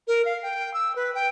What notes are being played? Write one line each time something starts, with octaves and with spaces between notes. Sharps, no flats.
A#4
F5
G5
E6
B4
G5